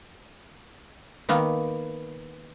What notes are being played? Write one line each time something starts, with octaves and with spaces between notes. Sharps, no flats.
D#3 A#3 B3